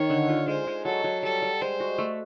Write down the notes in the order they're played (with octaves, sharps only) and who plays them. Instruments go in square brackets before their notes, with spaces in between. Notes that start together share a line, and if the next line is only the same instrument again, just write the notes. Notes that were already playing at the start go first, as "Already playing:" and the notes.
Already playing: [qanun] D#3 [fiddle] C#5
[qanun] D3
F4
[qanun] G#3 [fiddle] C5
[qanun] G#3
[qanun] F#3 [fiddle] A4
[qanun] F#3
[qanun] G3 [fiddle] A4
[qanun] G3
[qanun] G#3 [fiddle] C5
[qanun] F#4
A3